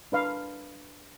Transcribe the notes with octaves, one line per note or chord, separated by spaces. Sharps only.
D4 B4 F5